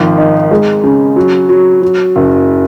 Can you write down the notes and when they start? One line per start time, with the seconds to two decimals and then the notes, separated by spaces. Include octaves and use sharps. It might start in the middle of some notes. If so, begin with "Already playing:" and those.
Already playing: G#1 D#3 F3
0.18 D#4
0.51 G#3
0.84 C#3
1.16 F#3
1.49 F#3
1.82 F#3
2.16 F#1